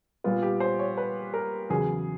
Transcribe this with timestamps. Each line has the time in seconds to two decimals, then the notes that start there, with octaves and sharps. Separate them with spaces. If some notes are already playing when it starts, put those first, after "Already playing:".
0.24 A#2 G3 B3 F4
0.43 G4
0.60 C5
0.79 C#5
0.97 B4
1.34 A#4
1.70 E2 C#3 F#3 G#4